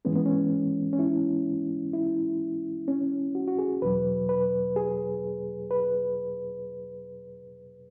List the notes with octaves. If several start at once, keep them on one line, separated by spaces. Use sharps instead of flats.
G#2 E3 G#3 B3 C#4
B3
C#4
C#4
E4
E4
C#4
F#4
F#4
G#4
E2 B2 F#3 B4
B4
G#4
B4